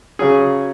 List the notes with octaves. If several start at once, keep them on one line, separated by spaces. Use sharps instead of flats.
C#3 F#3 C#4 G#4